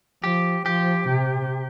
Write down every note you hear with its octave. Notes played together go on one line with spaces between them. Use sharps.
F3 G4
F3 G4
C3